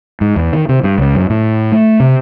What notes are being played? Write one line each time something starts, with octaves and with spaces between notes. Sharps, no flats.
G#2
E2
D#3
C3
G2
C#2
F#2
A2
A3
C3